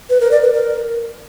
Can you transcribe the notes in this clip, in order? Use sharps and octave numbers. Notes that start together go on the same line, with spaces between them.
B4
A#4
D5
B4
A#4